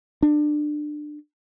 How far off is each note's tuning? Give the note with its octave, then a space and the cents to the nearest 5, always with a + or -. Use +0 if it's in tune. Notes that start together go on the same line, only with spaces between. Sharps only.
D4 +25